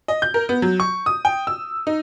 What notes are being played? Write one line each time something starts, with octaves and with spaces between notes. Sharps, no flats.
D#5
G6
A#4
B3
F#3
C#6
D#6
G5
E6
D#4